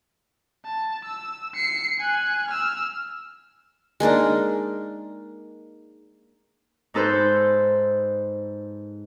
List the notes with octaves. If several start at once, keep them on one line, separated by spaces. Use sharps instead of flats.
A5
E6
C7 C#7
G#5 F#6
E6 F6
G#3 A#3 D4 D#4
G#2 D#4 A4 B4 C5 G6